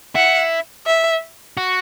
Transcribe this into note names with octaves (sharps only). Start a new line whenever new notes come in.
E4 F#5
E5
F#4